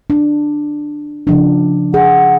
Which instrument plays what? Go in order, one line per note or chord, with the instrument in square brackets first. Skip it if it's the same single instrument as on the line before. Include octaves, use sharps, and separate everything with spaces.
[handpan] D4
C#3 F3 D4
[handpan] G#4 [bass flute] F#5